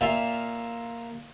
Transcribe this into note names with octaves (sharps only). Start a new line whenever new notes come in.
A#2 F4 E5